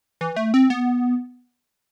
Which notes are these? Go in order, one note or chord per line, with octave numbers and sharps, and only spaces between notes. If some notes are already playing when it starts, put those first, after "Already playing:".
E3
A3
C4
B3